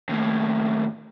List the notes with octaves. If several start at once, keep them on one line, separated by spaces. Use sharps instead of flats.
D#2 A2